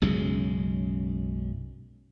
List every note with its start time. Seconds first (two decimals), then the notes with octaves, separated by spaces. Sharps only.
0.02 B1 F#2 C#3 G#3